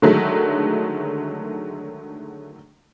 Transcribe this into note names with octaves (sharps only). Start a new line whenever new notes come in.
D3 D#3 F#3 G#3 A3